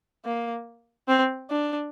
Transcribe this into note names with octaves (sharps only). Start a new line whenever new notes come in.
A#3
C4
D4